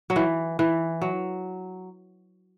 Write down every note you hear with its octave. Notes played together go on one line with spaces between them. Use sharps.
F#3
E3
E3
F#3